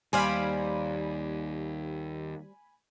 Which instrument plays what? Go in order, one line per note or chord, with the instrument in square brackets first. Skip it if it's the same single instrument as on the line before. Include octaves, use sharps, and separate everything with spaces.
[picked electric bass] D#2 [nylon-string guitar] G3 [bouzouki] C5 D5 F5 [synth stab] G#5 B5